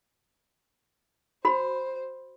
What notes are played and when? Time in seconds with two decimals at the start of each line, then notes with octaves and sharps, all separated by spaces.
1.45 F#4 C5 B5